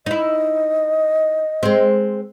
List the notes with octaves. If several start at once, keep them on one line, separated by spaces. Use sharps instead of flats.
D#4 E4 D#5
G#3 C4